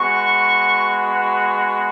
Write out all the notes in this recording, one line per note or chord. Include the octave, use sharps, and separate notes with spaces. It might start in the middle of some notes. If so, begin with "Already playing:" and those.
Already playing: G#3 B3 F#4 C#6